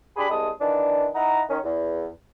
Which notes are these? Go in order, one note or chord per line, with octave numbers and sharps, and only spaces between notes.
D4 G4 G#4 B5
C2 C3 G#3 A5 D#6
D#3 E3 D4
D#4 E4 F#5 A#5
D#3 C#4
E2